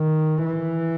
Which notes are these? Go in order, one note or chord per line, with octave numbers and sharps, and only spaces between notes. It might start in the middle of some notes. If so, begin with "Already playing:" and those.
Already playing: D#3
E3